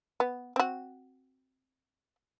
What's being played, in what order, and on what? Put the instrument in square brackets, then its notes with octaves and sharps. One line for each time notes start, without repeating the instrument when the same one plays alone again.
[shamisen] B3
C4 F#4